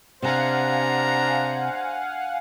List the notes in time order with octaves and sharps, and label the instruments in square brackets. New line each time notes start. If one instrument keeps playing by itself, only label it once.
[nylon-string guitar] C3 [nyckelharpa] D4 A#5 [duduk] C5 [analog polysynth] F5 F#5 G#5